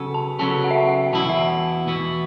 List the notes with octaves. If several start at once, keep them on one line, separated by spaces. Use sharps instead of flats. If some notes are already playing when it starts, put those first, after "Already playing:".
Already playing: C#3 F#3 B3 A4
A5
C#3 F#3 B3 A4 A5
F#5
E5
F#5
E5
E2 B2 B3 E4 A5
F#5
E5
F#5
E2 B2 B3 E4